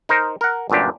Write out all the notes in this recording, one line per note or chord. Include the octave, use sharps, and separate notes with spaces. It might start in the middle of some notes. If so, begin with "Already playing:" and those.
D#4 A#4 C5
A#4 F#5
G1 F#2 A#2 D4 G4